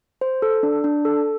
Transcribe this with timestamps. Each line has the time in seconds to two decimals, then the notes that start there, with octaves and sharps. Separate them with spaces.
0.21 C5
0.42 A4
0.63 D4
0.84 D4
1.05 A4